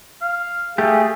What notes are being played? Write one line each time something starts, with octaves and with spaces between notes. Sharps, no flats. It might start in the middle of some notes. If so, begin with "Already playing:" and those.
F5
A3 G4 G#4